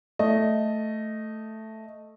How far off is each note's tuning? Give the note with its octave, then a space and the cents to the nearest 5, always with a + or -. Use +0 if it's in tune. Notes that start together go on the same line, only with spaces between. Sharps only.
A3 +0 D#5 +0